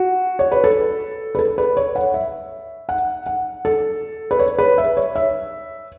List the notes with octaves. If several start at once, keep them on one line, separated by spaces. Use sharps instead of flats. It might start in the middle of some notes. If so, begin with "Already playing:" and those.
Already playing: F#4
C#5
B4
A4
B4
A4
B4
C#5
F#5
E5
F#5
F#5
A4
B4
C#5
B4
E5
C#5
E5